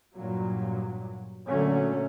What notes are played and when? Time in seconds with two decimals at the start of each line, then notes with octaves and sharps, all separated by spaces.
0.15 G2 A#2 F#3
1.48 A#2 D3 F#3 A3 C#4